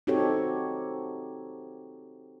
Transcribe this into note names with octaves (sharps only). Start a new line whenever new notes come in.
C4 D#4 F#4 G4 A4 C#5